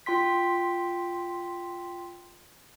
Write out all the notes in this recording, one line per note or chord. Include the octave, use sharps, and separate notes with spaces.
F4 G5 C6 B6